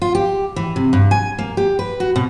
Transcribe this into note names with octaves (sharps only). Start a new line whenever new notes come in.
F4
G4
E3
C3
G2
G#5
A#3
G4
B4
F#4
B2